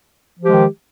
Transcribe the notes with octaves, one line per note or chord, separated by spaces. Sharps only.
D#3 F3 G#3 G4